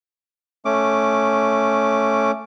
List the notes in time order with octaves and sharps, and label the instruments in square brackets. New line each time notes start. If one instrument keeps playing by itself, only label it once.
[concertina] A3 C#4 D6